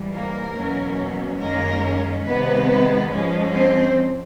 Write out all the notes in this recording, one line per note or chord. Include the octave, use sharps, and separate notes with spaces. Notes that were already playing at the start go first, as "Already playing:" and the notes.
Already playing: G#2 E3 G3
A#3 A#4
E2 B2 F#3 A#3 C#4
F#2 D#3 G#3 A#3 C#4 A#4
C3 D#3 G#3 B3 B4
G#2 F3 G#3 C#4
C4 C5